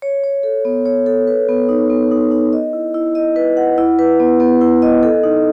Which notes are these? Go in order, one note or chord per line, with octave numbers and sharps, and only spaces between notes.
C#5
C#5
A4
B3
C#5
A4
B4
B3
D#4
B3
D#4
D#4
D#5
E4
E4
D#5
B4
F#5
E4
B4
B3
B3
E4
D#5
A4
D#4